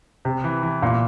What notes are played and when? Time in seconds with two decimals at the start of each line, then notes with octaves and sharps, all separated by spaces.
0.25 C3
0.44 E3
0.63 E3
0.83 A#2